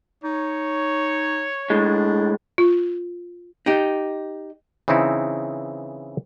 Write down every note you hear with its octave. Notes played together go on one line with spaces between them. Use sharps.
D#4 C#5
A2 G#3 D4
F4
D#4 G4
C#3 E3 C4 D#4 E4